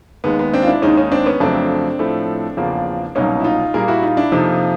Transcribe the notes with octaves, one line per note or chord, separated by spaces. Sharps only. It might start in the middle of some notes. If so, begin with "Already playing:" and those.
D#2 D#3 G#3 B3
B3
C4 D4
F4
D4 E4
D#2 D#3 G#3 C#4 D#4
C#4 D#4
C4 D4
B3 C#4
F2 C#3 F#3 A3 C4 D4
A2 F3 A3
E2 C#3 F3 A#3
C2 B2 F#3 A#3 C#4 D#4
E4
D#4 F4
A#2 G3 A#3 G#4 A#4
E4 F#4
D#4 F4
D4 E4
F2 C3 F3 A#3 D#4 F4